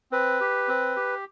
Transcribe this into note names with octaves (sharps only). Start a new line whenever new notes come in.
C4 B4
G4
C4
G4